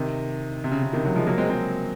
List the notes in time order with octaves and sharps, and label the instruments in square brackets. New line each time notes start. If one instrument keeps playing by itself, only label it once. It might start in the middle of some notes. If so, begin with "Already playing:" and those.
Already playing: [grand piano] C3 D#3
C3
C#3
C#3
C3 D#3
D#3 F#3
F3 G#3
F#3 A#3
G#3 C4
G#3 C4